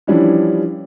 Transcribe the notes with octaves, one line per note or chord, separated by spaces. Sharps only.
E3 F3 G3 C#4 D4 E4